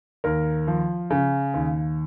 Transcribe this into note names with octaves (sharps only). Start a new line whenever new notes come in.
D#2 A#4
F3
C#3
D#2